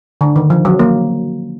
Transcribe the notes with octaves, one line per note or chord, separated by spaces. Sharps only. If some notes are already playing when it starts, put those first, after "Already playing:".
D3
D#3
F3
F#3
A#3